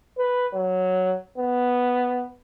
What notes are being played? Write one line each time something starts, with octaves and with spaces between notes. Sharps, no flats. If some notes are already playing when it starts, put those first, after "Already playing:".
B4
F#3
B3